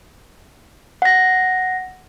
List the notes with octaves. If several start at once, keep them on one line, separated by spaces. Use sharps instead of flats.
F#5 A#6